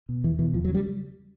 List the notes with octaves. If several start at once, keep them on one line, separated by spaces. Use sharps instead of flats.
B2
E2 E3
B2 E3
E2 F3
F#3
C#3
G3